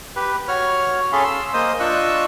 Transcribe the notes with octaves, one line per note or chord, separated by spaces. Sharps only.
G4 B4
F#4 C#5 F6
C#4 G#4 A4 F5 B5 C6
C6 E6
A#3 C5 D#5 D#6
D4 F4 D#5 C#6 E6 F#6